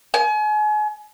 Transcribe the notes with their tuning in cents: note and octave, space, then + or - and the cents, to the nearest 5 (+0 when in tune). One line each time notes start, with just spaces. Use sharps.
G#5 +35